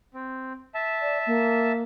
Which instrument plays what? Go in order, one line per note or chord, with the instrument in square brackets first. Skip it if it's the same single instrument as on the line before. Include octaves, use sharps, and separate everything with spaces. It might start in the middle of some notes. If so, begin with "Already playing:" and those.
[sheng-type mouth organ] C4
E5 A5
[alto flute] D5
A#3